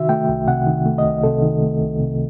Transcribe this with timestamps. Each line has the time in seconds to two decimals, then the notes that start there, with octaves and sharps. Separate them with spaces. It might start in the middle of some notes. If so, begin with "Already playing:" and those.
Already playing: C3 D#3 F#4 E5
0.09 A3 G5
0.29 C2
0.47 C3 F#5
0.66 D#3
0.86 A3
0.98 D#5
1.05 C2
1.23 C3 A4
1.42 D#3
1.62 A3
1.81 C2
2.00 C3